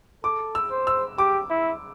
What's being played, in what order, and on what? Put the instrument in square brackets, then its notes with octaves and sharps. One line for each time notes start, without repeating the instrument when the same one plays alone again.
[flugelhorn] A4 [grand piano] D6
[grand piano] E6
[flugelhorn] C5
[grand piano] E6
[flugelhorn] G4 [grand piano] D6
[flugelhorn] E4